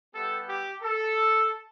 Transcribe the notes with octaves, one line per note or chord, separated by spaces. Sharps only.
G3 B3 E4 G4 A4
G4
A4